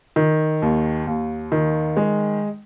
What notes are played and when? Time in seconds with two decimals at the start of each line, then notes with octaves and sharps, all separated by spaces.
0.16 D#3
0.62 D#2
1.07 D#2
1.52 D#3
1.97 G#3